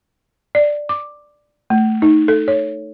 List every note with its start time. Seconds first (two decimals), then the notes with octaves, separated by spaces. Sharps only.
0.55 D5
0.89 D6
1.70 A3
2.02 D#4
2.28 A4
2.48 C#5